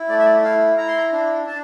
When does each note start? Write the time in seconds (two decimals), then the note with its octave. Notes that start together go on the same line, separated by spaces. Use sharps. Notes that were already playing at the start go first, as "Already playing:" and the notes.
Already playing: E4
0.09 A3 D5
0.19 E5
0.26 D5
0.43 E4 F5
0.78 E4 A#5
0.88 C6
0.97 A#5
1.12 D4
1.47 D4 A5